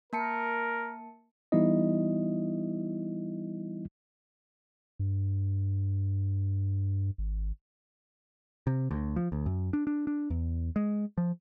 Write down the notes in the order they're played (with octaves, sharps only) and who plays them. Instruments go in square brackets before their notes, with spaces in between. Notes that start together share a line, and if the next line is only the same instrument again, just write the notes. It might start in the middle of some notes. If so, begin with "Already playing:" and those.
[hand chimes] A#3 A5 C#7 [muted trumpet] A#4
[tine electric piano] E3 G3 B3 D#4 E4 D#5
[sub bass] G2
G#1
[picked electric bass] C3
D2
F3
D2
F#2
D4
D4
D4
E2
G#3
F3